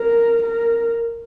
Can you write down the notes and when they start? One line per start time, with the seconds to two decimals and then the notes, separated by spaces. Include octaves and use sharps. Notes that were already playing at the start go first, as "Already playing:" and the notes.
Already playing: A#4
0.43 A#4